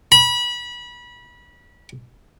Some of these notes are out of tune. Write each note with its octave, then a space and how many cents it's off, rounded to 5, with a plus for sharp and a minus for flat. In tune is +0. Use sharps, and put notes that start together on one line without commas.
B5 -30